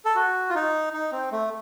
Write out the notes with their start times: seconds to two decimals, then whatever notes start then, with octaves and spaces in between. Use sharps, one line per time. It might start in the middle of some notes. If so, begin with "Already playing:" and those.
0.05 A4
0.15 F#4
0.50 F4
0.55 D#4
0.93 D#4
1.12 C4
1.32 A3